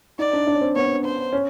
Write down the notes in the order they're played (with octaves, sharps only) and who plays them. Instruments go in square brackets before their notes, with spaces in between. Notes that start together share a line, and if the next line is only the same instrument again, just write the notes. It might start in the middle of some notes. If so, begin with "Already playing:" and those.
[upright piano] D#4 [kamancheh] D5
[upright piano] D4
D4
C#4
C4
[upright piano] B3 [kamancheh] C#5
[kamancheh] C5
[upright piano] C#4